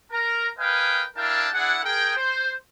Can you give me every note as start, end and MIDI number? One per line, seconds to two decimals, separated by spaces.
0.12 0.49 70
0.12 0.49 82
0.58 1.03 70
0.58 1.03 71
0.58 1.03 75
0.58 1.03 77
0.58 1.03 79
0.58 1.03 80
1.17 1.48 62
1.17 1.48 64
1.17 1.48 70
1.17 1.48 77
1.17 1.48 79
1.17 1.48 81
1.54 1.78 62
1.54 1.78 64
1.54 1.78 68
1.54 1.78 78
1.84 2.16 68
1.84 2.16 70
1.84 2.16 79
2.17 2.54 72